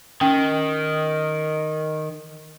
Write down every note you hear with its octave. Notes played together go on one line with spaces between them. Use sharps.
D#3 C#4 G5